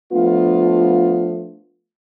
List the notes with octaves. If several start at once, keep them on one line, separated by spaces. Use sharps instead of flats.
F3 A3 B3 D4 F4